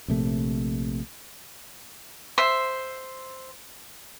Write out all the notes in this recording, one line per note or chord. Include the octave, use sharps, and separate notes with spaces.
A#1 C3 A3
C5 E5